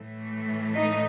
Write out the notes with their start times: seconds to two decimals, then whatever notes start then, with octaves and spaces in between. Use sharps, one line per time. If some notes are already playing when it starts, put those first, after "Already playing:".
Already playing: A2 E3 A3
0.74 D#4